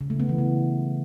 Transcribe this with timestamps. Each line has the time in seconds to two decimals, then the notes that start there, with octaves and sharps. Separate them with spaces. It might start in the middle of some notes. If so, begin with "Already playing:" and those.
0.01 C#3
0.10 A3
0.20 B3
0.29 E3
0.38 C#3